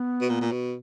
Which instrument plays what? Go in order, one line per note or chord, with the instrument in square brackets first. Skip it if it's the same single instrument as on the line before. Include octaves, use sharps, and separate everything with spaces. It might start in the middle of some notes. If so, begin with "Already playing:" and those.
Already playing: [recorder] B3
[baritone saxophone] B2
A#2
A#2
B2